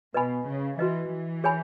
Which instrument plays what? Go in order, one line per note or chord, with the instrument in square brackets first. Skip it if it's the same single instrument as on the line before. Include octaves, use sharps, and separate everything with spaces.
[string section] B2 [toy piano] B4 D#5 G#5 B5
[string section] C#3
[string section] E3 [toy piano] F#4 B4 D#5
[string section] E3
[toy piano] G#4 C#5 G#5 B5